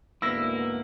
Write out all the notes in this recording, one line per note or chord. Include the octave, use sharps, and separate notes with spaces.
D2 G#2 A#3 B3 E4 E6 A#6